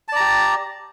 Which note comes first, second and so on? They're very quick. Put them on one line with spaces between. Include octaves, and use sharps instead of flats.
A5 D5 A#5 G4